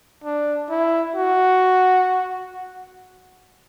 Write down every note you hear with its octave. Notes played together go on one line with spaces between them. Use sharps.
D4
E4
F#4